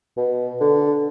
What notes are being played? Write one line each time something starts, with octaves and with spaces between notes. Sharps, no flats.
B2
D3